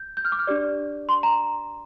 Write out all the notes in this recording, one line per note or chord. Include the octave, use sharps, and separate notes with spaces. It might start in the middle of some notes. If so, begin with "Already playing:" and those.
Already playing: G6
G6
F6
D6
F6
D4 G4 D5
C6
A#5